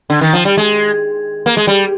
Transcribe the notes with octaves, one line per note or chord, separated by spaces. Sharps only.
D3
D#3
F3
G3
G#3
A#3
G#3
G3